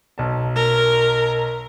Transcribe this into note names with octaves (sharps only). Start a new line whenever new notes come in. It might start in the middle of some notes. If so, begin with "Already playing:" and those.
B1 A5
A#4